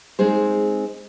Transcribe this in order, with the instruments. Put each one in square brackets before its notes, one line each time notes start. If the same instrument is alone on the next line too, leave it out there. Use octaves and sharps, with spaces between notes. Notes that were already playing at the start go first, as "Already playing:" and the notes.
[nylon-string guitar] G#3 C4 D#4 G#4 C5